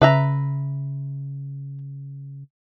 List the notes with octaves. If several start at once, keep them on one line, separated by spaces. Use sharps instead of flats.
C#3 B4 E5 A#5